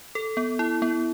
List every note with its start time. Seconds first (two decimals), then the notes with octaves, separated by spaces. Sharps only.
0.15 A4
0.37 B3
0.59 E4
0.82 B3